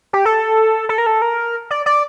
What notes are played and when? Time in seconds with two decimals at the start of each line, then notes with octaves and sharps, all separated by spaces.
0.13 G4
0.25 A4
0.89 A4
0.98 A#4
1.06 A4
1.22 A#4
1.70 D5
1.86 D5